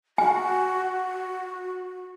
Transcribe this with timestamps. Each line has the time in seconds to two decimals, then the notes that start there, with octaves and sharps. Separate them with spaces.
0.18 F#4 G#5